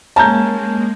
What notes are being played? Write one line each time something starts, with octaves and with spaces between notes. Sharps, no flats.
G#3 A#3 C#4 A5 A#5 G6